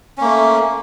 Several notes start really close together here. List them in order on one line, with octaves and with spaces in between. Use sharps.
C#4 A#3 A3